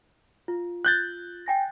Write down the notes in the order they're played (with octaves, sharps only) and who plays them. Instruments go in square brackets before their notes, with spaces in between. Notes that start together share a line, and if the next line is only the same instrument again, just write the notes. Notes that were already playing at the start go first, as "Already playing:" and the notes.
[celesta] F4
[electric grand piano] F#6 G6 A6
[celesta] G5 G#5 A#6